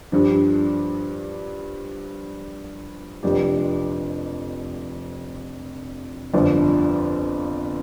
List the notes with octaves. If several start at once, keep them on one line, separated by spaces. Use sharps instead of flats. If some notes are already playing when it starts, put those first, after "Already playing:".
G2 F3 D4
F1 F2 F3 D4 G4
G1 F2 F3 D4